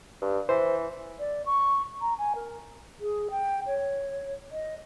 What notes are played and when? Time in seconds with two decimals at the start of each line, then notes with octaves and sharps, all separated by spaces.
0.22 G2
0.49 E3 C5
1.19 D5
1.46 C#6
2.01 A#5
2.18 G#5
2.35 A#4
3.00 G#4
3.31 G5
3.67 C#5
4.51 D#5